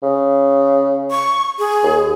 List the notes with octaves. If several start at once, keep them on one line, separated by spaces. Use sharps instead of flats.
C#3
C#6
G#4
D#2